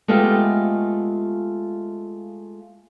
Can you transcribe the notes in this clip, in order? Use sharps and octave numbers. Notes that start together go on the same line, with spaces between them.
G#3 A3 B3 F4 G4